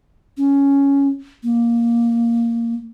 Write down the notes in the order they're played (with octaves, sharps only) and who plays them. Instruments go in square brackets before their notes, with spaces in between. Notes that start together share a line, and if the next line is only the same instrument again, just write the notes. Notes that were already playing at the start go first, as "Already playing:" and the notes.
[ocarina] C#4
A#3